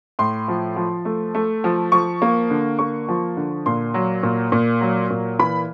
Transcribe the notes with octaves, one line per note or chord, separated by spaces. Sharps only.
A2 C6
F3
F3
A3
A3
F3
F3 C#6
A#3
D3
A#3 C#6
F3
D3
A#2 C6
F#3
A#2
A#2
F#3
A#2
E3 B5